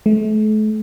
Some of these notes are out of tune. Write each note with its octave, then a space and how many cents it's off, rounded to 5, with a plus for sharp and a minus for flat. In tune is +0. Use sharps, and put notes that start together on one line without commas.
A3 -40